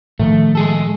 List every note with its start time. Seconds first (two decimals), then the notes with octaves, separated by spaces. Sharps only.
0.20 A2 D#3 F3 A3
0.55 G#3 G#4 A4